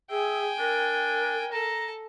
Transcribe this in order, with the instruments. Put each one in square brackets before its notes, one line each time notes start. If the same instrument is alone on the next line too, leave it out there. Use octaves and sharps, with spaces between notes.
[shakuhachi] G#4 [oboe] E5 [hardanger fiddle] G5 G#5
[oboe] D4 [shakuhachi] A#4
[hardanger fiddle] A4 A5 [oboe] A#5